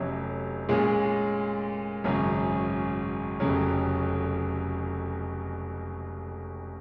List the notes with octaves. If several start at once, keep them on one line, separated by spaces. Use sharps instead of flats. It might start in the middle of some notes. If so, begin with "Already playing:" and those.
Already playing: F1 F2 C3 F#3 C#4
A#2 G#3 C#4 G#4
G#1 F#2 C#3 F#3
F1 F2 C#3 F#3